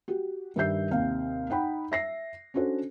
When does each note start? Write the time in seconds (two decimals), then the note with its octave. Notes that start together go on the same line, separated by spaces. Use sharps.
0.08 F#4 G4
0.56 G2 D#3 G4 E5 G6 C7
0.91 D#2 C3 F5
1.50 D#4 F#5 G5 B5
1.92 E5 A#6 C7
2.54 C#4 D4 F#4 A4 C5